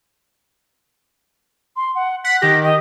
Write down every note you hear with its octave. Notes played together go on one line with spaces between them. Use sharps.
C6
F#5
F#5 B6
D#3 G4 A#6
D#5